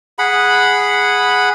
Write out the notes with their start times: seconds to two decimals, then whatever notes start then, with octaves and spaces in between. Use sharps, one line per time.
0.19 G#4 F#5 B5